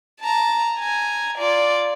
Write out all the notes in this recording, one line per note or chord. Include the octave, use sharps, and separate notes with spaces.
A5 A#5
G#5 A#5
F4 D5